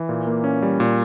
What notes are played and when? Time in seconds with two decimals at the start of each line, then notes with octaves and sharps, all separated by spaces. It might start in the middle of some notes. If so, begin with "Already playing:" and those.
Already playing: E3
0.09 A#2
0.27 A#3
0.44 C#4
0.62 G3
0.80 A#2